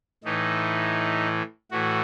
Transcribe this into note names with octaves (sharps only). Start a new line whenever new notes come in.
A2 E3 D#4
A2 E3 F#4